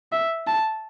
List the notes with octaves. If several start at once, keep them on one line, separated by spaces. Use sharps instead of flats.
E5
A5